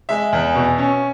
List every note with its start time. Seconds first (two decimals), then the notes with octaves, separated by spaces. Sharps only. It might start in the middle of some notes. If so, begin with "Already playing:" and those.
0.09 G#3 E5
0.32 E2
0.55 B2
0.78 C#4